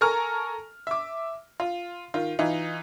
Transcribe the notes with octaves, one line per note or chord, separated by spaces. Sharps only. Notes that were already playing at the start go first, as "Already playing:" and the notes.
A4 A#4 G#5 A#5 C#6 F6
E5 D6
F4
D#3 F4
E3 D#4 F4